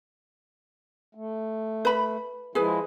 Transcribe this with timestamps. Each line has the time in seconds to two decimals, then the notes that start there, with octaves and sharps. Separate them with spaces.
1.15 A3
1.85 B4 B5
2.55 F3 G#3 E4 G#4 B4